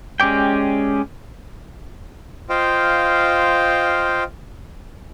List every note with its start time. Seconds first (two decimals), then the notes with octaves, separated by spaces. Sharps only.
0.20 G#3 C#4 G4 D5 G5
2.49 F4 C5 D#5 F5 G5